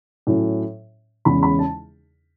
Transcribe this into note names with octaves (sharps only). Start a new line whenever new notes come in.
A2 F#3 C#4
E2 C#3 G#3 C#4 B5
B5
A5